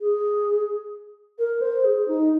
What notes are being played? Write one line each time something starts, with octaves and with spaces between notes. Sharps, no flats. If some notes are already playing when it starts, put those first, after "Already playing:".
G#4
A#4
C5
G#4
D#4